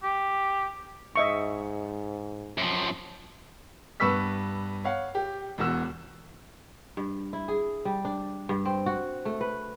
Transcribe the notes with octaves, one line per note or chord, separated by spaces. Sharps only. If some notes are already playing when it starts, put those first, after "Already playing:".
G4
G#2 D#5 E5 C#6
F#2 F3
G2 B3 B4 C#6 E6 B6
C#5 F5 F#5
G4
E1 E2 F#4 E6
G2
E4
G#4
G3
D4
G2
C4
F#4
A3
B4